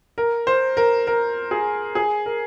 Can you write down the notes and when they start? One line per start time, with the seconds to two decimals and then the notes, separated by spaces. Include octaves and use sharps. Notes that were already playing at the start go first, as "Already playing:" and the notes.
0.18 A#4
0.47 C5
0.77 A#4
1.07 A#4
1.51 G#4
1.95 G#4
2.26 A#4